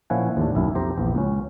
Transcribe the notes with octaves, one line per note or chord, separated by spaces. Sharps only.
A#2 F3 C#4 E4 F#5 G#5
D#2 A2 D4
B1 F#2 E4
F2 G4 C5 A#5
A#1 E2
C#2 C#4